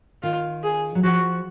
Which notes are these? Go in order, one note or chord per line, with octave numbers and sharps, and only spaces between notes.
D#3 F4
G#4
F#3
F3 F#4